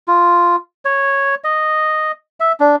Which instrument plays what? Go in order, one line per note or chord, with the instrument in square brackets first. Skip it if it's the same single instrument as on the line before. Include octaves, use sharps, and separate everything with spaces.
[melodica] F4
C#5
D#5
E5
D4